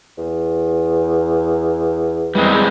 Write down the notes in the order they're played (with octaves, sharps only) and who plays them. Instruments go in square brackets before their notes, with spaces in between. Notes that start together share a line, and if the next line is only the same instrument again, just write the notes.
[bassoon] E2
[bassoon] E2 [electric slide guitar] G3 G#3 C4